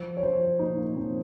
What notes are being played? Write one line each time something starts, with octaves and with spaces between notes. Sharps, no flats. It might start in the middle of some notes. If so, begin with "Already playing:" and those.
Already playing: F3 C5
C#5
F3 C5
A#2 D#4
A#3
F3 C4